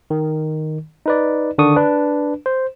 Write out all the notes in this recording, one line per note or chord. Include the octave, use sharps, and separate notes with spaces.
D#3
D#4 B4 D5
D3 D#3 D4 C#6 D#6
D4 B4
C5